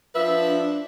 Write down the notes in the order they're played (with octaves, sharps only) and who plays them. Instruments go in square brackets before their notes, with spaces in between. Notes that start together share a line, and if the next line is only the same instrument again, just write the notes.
[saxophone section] F3 B4 E5 [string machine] D4